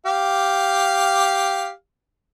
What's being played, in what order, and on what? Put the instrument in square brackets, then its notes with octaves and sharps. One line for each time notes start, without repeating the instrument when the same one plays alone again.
[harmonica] G4 F5